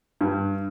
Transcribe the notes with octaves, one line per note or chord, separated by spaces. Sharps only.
G2